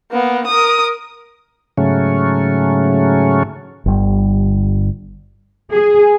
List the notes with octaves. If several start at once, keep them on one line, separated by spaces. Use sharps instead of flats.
A#3 B3
A#4 D#6
G#2 C#3 F#3 A3 C#4
G1 G3
G#4